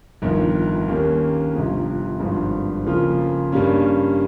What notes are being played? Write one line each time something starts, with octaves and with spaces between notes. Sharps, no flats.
G1 F2 D#3
D#2 D#3 A#3 C#4 G4
G1 F2 C3 F3
G#1 G2 F3 C4
F2 C#3 F3 A#3 F4
G2 G3 A#3 C#4